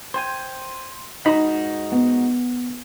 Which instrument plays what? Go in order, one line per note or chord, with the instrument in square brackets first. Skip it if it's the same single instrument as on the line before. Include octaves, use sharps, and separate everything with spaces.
[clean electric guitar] C5 G5 G#5
[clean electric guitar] G#2 F#4 B5 [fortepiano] D#4
[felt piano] B3